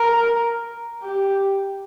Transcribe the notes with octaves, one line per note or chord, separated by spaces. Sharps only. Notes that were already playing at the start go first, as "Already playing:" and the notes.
Already playing: A#4
G4